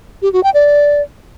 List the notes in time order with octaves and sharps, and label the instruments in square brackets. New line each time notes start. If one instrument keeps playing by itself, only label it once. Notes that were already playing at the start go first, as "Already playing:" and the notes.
[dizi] G4
F#4
G5
D5